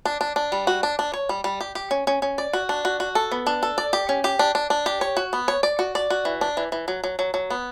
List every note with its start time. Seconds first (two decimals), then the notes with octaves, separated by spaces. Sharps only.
0.05 D4
0.21 D4
0.36 D4
0.52 G3
0.67 F#4
0.83 D4
0.99 D4
1.14 C#5
1.29 G3
1.44 G3
1.61 G4
1.75 G4
1.91 C#4
2.07 C#4
2.22 C#4
2.38 D5
2.53 F#4
2.69 D4
2.85 F#4
3.00 F#4
3.15 A4
3.32 B3
3.47 D4
3.63 A4
3.78 D5
3.93 G4
4.09 C#4
4.24 G4
4.39 D4
4.55 D4
4.70 D4
4.86 G4
5.01 C#5
5.17 F#4
5.33 B3
5.48 C#5
5.63 D5
5.79 F#4
5.95 D5
6.10 F#4
6.25 E3
6.41 D4
6.57 E3
6.72 E3
6.88 F#3
7.04 F#3
7.19 F#3
7.34 F#3
7.50 B3